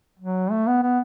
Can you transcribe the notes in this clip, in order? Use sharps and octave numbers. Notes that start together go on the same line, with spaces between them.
F#3
A3
B3
B3